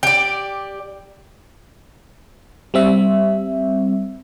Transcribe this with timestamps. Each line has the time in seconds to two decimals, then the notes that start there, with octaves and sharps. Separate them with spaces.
0.03 G4 D5
2.74 G3 C4 E5